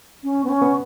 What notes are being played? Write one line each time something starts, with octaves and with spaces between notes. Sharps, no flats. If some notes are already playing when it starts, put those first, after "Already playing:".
C#4
B3
C#4
B3